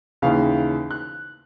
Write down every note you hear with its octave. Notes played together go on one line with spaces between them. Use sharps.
D#2 C#3 E3 F5
F#6